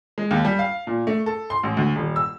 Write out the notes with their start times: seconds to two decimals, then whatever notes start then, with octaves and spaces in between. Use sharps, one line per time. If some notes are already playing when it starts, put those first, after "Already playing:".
0.18 G#3
0.31 D#2
0.45 G3
0.59 F5
0.87 A#2
1.07 A3
1.26 A4
1.50 C6
1.63 A1
1.77 D2
1.96 D#1
2.16 E6